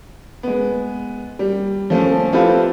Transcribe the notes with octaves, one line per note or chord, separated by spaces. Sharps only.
G#3 B3
G3
F3 A3 C#4
C4 E4 F4 G4 A4 B4